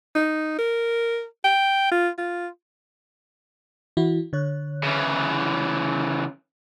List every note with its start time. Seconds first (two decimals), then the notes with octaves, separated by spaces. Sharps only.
0.15 D#4
0.59 A#4
1.44 G5
1.91 F4
2.18 F4
3.97 E3 E4 F#4
4.33 D3 C#5 F#6
4.83 C#3 E3